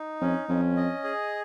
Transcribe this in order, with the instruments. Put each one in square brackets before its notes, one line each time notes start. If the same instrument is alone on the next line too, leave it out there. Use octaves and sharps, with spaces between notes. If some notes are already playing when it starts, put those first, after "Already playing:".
Already playing: [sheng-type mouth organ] D#4
[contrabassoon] F2 [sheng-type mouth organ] C#4
[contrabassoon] F2 [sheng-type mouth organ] C#4
[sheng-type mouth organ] D#5
G#4